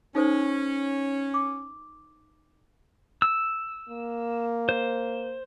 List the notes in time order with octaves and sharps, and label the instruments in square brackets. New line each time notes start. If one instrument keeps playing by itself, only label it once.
[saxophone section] C#4 [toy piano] D#4 A4 C5
[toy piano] D6
[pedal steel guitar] E6
[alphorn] A#3
[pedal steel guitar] C5